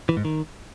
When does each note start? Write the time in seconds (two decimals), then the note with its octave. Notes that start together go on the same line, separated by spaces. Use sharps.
0.09 E3
0.17 G#2
0.25 D#3